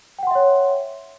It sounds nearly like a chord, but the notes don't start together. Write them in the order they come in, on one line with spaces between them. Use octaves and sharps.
G5 F#5 C6 E5 C#5